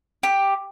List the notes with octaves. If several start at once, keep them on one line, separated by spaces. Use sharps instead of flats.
G4